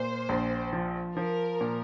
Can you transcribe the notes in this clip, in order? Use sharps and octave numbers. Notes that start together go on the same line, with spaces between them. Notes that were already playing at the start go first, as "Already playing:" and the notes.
Already playing: A#2 C5
A#1
F3
F3 A#4
A#2